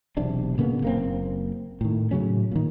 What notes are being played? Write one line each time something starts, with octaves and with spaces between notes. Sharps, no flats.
E1 B1 C3 D4
A#2 C#3 A#3 B3
F#1 A#3 C4
A2 D#3
A2 C#3 F#3 C#4
A#2 D#3